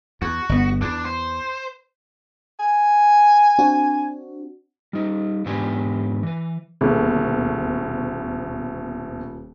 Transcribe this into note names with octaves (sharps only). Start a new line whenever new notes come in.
E2 F#4
G1 B3
E2 D4
C5
G#5
C4 D4 F#4
G3 D#4
E2 G#2 B3 D4 G4 G#5
E3 B4
D#1 D2 B2 A#3 G#4 A4